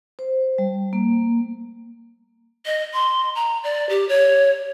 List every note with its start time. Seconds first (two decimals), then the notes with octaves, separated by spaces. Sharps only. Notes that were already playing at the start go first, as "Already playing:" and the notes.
0.19 C5
0.58 G3
0.93 A#3
2.66 D#5
2.93 C6
3.35 A#5
3.64 D5
3.89 G4
4.09 C#5